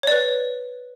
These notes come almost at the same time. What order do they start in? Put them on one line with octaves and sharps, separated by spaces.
C#5 D5 B4